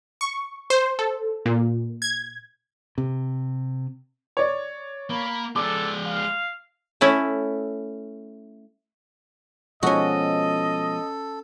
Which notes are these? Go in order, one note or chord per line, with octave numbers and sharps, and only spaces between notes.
C#6
C5
A4
A#2
G#6
C3
C#5 D5
A#3 B5
G#3 A4 D5 D6
F5
A3 C#4 E4
B2 F3 G#3 C#4 F#4 A4 D#5